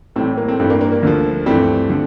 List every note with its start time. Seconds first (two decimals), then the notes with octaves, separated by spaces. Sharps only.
0.16 A2 E3 G3 A3 C4
0.37 A#3
0.48 A3 C4
0.59 G2 E3 G3 A3 C4
0.70 A#3 D4
0.81 A#3 D4
0.92 A#3
1.03 D2 D3 F3
1.46 G2 E3 G3 A3 C4
1.89 D3 F3